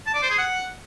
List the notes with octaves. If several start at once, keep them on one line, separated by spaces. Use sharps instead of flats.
A5
D5
C5
G#4
F#5